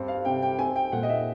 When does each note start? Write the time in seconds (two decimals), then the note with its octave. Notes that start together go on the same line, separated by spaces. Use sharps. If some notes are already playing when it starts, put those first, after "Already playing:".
Already playing: G2 C4
0.08 F5
0.25 C3 G5
0.42 G5
0.58 C4 G#5
0.76 G5
0.92 A#2 F#5
1.03 D#5
1.09 E5